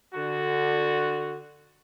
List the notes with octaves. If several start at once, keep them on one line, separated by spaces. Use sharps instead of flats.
D3 F#4